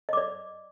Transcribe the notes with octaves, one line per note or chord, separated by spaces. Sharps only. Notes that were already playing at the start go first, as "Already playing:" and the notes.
D5 D#5 D6